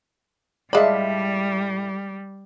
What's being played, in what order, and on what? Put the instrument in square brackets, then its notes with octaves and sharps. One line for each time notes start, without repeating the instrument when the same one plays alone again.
[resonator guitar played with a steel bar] A2 E5 A5 [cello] G3 [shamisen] G#3 B5 [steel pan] D5 F5